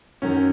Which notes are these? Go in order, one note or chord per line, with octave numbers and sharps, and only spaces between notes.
F#2 D#3 F#3 C#4